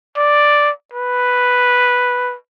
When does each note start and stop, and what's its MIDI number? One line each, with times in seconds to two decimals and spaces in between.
0.17 0.70 74
0.93 2.35 71